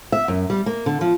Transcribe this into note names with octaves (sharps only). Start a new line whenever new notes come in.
E5
F#2
G3
A#3
D3
F3